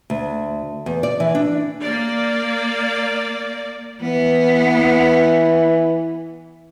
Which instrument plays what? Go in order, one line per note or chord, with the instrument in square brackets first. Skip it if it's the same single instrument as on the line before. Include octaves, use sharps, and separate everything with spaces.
[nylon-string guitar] D2
E2
D5
E3
D4
[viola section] A#3 D5
[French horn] E3 [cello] B3